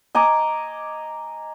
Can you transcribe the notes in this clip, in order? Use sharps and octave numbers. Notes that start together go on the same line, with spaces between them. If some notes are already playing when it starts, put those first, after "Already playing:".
D#5 G#5 A#5 D6